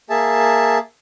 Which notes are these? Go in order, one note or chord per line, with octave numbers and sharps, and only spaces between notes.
A#3 G#4 E5 A5